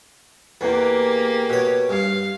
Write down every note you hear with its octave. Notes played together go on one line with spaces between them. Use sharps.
E2 A#3 G4
B2 C#5
G2 F5